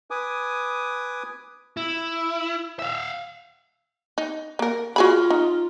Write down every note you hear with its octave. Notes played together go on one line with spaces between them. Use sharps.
B4 G#5 D6 D#6
E4
E5 F5
D#4
A#3 A#4
F4 F#4 G#4 B5
D#4